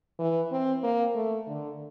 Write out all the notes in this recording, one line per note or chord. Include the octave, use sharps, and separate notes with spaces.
E3
C4
A#3
A3
D3